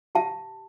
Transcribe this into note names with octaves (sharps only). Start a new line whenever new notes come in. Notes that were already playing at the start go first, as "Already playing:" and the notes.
G4 F5 A5